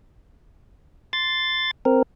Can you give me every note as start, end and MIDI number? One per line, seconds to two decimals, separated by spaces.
1.13 1.71 84
1.13 1.71 93
1.85 2.02 60
1.85 2.02 70